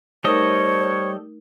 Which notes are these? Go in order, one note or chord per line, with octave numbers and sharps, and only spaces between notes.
G3 A3 D#4 A4 A#4 C5 C#5 D#5